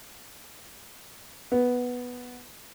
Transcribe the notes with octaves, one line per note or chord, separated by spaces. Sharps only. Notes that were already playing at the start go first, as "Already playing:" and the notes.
B3